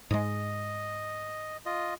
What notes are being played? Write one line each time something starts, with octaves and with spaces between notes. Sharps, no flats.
G#2 G#3 D#5
F4 D#5